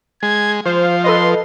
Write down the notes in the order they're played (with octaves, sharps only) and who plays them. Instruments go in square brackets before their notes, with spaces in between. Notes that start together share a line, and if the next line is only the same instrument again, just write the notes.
[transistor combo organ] G#3 [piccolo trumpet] G#6
[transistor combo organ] F3 [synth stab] C5 [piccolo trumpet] F5
[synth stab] A4 B4 D#5 [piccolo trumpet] C6